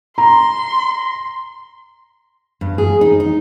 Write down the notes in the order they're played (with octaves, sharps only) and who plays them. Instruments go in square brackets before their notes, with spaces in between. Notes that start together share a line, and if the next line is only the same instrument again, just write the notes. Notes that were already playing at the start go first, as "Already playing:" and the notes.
[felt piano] A#5 [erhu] C6
[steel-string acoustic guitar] G2
G#4
D#4
D#4